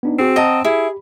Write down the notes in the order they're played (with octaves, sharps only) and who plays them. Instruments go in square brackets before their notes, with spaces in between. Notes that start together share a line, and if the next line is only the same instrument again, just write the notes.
[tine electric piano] B3 D4 D#4
[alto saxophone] C4 [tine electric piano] F#4 G#4 C7
[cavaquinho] D#5 A#5 [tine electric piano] F#5 A5 D#6
[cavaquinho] E4 [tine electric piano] G4 [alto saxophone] G#4